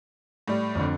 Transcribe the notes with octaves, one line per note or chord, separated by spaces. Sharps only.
A2 G3
F2 D3